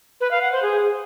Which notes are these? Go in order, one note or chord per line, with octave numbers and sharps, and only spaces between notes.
B4
F5
F#5
C5
G#4